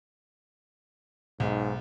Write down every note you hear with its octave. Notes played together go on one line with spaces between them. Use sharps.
B1 G#2